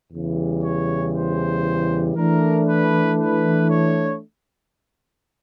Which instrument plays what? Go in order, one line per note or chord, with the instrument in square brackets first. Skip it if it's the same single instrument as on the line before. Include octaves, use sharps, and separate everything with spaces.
[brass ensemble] E2 C#3 E3 G3
C#5
C5
E3 A3 D4 A#4
B4
B4
C#5